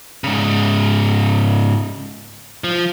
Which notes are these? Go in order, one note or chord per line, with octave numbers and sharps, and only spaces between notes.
G#2 C#3
F3